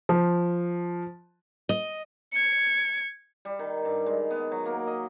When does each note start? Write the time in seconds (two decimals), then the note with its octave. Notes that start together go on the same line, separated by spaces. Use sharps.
0.09 F3
1.69 D#5
2.33 G#6 C#7
3.45 G3
3.59 D#3
3.85 G2
4.06 G#3
4.30 B3
4.52 F#3
4.66 A#3
4.87 D#5